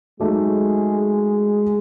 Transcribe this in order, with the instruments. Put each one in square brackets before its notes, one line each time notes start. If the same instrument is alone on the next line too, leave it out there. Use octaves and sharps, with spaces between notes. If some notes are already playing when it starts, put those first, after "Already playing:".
[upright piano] F#3 A3 D#4 [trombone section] G#3